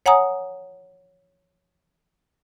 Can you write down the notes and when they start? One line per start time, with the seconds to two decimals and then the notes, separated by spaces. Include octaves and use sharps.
0.06 C#5 F#5 G#5 A#5 D#6